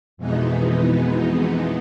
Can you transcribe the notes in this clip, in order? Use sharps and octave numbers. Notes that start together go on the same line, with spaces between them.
F2 B2 E3 G#3 B3 D#4